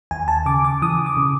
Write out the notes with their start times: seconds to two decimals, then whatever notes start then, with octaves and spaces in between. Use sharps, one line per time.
0.11 D#2 G#5
0.28 A5
0.46 C#3 D6
0.65 D6
0.82 E3 D#6
1.06 D6
1.17 C#3